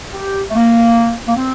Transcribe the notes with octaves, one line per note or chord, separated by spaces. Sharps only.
G4
A3
A#3
A#3
C4